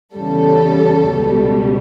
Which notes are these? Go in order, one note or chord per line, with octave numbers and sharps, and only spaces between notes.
E2 C#3 G3 A4
C#2 B2 G3